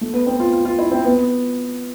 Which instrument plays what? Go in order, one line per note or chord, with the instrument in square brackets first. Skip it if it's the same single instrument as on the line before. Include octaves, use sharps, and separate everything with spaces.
[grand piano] A3
B3
C4
F4
F4
F4
E4
C4
B3